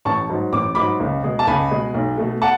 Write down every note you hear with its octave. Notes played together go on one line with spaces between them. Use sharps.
A1 A5 C#6
G#2 F#3
A1 D6
G#2 F#3 B5 D6
C#2
B2 G#3
A5
C#2 G#5 B5
B2 G#3
B1
B2 A3
F#5 A5